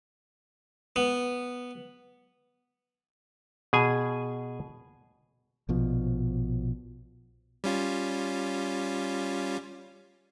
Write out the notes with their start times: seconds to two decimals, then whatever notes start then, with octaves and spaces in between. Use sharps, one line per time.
0.96 B3
3.73 B2 G#4 G#5
5.69 A#1 B2 F3
7.64 G3 C#4 F4